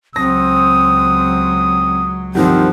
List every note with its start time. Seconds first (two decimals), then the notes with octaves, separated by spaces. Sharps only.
0.16 C#2 F#3 C4 D#6 A#6
2.35 G2 D#3 F3 C4 F#5